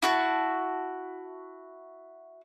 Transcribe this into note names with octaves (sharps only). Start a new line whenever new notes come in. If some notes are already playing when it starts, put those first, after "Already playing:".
E4 F#4 A5